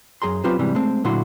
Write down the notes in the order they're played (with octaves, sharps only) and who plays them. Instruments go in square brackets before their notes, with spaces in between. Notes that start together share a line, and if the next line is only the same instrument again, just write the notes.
[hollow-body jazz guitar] F#2 G#4 A#5 C6
F#3 C4 F4 G4 B4 C5
G#2 C3 E3 G3
G#3 A3 C4
A#2 D3 F#3 E4 F#4 C6